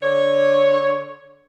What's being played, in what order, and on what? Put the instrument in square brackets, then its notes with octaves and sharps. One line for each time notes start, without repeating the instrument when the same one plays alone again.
[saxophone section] D3 C#5